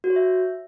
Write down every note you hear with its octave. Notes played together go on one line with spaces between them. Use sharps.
F#4
C#5
E5